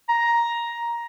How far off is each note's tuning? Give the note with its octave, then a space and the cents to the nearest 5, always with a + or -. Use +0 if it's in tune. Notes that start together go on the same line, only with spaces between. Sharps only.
A#5 +10